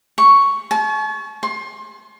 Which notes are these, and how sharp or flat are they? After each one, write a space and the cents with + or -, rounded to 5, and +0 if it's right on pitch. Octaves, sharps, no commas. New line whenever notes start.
C#6 +0
A5 -45
C6 +30